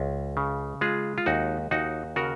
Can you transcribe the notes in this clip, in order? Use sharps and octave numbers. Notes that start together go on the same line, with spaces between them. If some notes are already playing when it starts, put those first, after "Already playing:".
Already playing: C#2
C#3
G#3 F4 G#4
F4
D#2 D#4 F#4
D#2 D#4 F#4
C#3 F#4 A#4